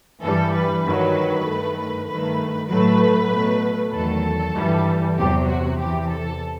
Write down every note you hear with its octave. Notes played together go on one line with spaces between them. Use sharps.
G2 E3 G3 A4
B4
G2 D#3 F#3
G2 D#3 A3
G2 D#3 A3 B4
A2 F#3 A3 B4
B2 F#3 A3
E2 D#3 F#3 A3 A4
G2 E3 G3
E2 C3 F#3 G4
F#4
E2 C3 E3 G4
A4